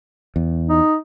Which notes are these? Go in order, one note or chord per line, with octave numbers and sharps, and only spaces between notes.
E2
D#4